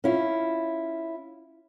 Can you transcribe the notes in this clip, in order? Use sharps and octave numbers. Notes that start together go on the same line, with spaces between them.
C#4 E4 F4